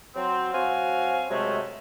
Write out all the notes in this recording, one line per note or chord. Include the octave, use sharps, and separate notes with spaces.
F#3 C4
F#3 C4 F#4 F5 G#5
C3 F#3 G#3 A3